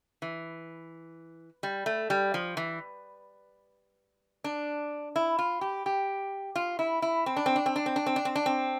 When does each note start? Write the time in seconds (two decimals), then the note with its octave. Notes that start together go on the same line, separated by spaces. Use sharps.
0.22 E3
1.63 G3
1.86 A3
2.10 G3
2.34 F3
2.57 E3
4.44 D4
5.16 E4
5.39 F4
5.61 G4
5.86 G4
6.56 F4
6.79 E4
7.02 E4
7.26 C4
7.37 D4
7.46 C4
7.56 D4
7.66 C4
7.76 D4
7.86 C4
7.96 D4
8.06 C4
8.16 D4
8.25 C4
8.35 D4
8.46 C4